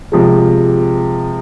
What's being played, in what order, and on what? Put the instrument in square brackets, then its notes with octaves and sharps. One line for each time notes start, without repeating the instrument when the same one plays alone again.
[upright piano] C3 F3 G#3